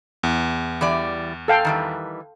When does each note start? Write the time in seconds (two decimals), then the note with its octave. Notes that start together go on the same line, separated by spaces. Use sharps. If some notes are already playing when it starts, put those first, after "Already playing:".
0.23 E2
0.81 E3 G3 D5
1.48 A4 F5 G5
1.65 D#3 E3 G3